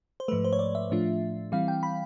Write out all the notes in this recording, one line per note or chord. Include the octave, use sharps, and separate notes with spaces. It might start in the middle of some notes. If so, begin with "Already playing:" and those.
C5
G#2 F3 A3 B4
C5
C#5
D5
E5
A2 F3 A3 D4 F4
E3 G3 C4 E4 F5
G5
B5